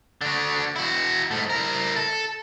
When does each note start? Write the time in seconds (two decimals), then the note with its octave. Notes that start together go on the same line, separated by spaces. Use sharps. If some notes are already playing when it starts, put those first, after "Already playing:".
0.21 D3 F#4
0.76 E4 F#4
1.31 G#2 A3
1.50 E4 A#4
1.96 A4